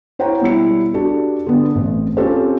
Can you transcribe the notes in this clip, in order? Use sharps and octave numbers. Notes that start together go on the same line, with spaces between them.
E4 C5 C#5 F#5 G5 A#5
B2 G3 E4 C#7
D4 F#4 G4 A4 D5
D3 B3
A1 C4
C4 C#4 F4 G4 A4 C5